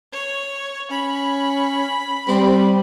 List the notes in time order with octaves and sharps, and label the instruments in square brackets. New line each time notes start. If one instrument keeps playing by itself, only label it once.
[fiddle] C#5
[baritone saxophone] C#4 [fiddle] B5
[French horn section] G3 [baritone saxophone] C4